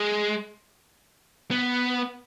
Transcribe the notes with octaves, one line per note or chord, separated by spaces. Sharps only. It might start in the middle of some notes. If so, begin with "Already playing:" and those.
Already playing: G#3
B3